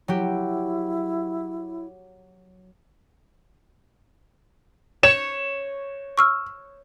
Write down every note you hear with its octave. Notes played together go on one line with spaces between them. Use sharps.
F#3 E4 G4
C#5 E7
C#6 E6 F6